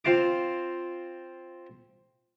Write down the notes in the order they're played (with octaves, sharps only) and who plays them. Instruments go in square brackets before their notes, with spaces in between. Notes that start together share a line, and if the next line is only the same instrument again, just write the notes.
[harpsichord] C4 F4 F5 A5 D6